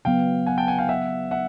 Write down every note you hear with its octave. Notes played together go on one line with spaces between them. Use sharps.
C#3 F#3 B3 F5 G5
F#5 G#5
G5 A5
F#5 G#5
F5 G5
E5 F#5
E5 F#5